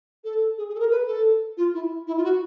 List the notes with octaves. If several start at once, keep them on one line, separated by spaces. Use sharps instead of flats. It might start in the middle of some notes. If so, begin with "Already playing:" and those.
A4
G#4
G#4
A4
A#4
B4
A4
F4
E4
E4
F4
F#4